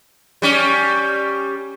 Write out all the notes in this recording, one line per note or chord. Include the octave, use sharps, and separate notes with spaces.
G3 C#4